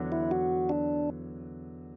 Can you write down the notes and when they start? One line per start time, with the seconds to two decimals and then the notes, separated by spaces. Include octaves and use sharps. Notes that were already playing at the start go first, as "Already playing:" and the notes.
Already playing: E2 D3 F#3
0.12 E4
0.31 F#4
0.69 D4